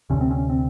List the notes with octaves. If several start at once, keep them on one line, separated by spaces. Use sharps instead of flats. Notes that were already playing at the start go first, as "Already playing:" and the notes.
D2 C3 C#4
C4
C#4
C4